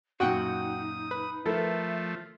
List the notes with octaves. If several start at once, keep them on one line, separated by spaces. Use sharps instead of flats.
F#2 A#2 D#4 F#4 F#5 G5 D#6
B4
F3 A3 E4 A4 A#4 E5